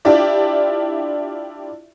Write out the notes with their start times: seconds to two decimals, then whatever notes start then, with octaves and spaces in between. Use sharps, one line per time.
0.05 D4 E4 F4 G4 D5 E5